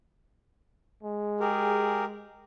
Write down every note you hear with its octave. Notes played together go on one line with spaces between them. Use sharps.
G#3
G4 G#4 A#4